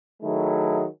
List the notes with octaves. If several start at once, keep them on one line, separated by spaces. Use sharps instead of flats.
D#3 F#3 A3 E4 G#4